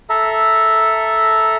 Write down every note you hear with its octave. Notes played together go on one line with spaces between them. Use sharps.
A4 E5 A#5